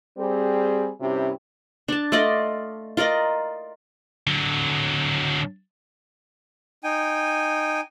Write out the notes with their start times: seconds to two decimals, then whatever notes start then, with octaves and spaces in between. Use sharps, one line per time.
0.18 G3 C4 G#4
1.00 G2 C3 C#4 E4 G4
1.88 D4 A5
2.12 A3 F4 D5 D#5
2.97 F4 A#4 D5 D#5
4.27 D3 F#3
6.84 D#4 G5 G#5